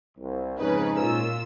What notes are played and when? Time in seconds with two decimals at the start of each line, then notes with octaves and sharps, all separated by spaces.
0.18 C2
0.58 F2 G#2 C#3 C#4 D#4 B4
0.98 A#2 F4 E6